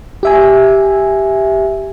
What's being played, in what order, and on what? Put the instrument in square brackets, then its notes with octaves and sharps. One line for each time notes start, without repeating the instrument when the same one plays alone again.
[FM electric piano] G4 E5 G#5